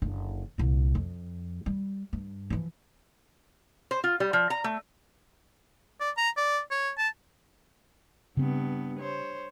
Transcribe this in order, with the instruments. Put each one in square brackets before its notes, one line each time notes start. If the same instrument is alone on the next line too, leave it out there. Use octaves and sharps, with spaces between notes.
[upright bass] F#1 D3
C2 A#2
F2
G3
G2
E3 F3
[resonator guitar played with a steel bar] C5
F4
G3
F3
A#5
A3
[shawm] D5
A#5
D5
C#5
A5
[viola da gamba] G2 B3 [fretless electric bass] C#3 C4
[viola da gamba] C5 C#5